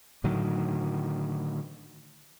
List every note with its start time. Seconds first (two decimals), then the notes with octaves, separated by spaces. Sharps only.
0.24 A2 D3 D#3 F#3